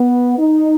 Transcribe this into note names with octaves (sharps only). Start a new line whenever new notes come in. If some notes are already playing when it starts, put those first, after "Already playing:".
Already playing: B3
D#4